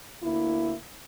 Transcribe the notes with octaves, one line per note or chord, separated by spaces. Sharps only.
D2 A#3 E4